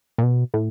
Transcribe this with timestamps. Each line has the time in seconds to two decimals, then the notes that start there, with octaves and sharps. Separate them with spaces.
0.18 A#2
0.23 B2
0.54 A2